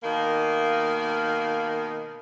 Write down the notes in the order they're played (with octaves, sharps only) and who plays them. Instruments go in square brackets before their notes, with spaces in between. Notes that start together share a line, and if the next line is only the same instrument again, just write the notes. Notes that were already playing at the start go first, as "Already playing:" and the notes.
[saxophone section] B2 D#3 A#3